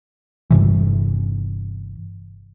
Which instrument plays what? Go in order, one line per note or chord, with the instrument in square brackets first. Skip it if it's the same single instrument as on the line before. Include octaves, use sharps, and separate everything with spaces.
[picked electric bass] G1 G2 C3 E3